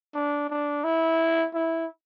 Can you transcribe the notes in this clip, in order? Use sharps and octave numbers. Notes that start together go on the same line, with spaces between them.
D4
D4
E4
E4